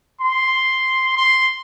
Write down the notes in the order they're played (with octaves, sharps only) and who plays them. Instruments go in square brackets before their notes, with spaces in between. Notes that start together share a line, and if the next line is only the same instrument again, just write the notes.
[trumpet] C6
C6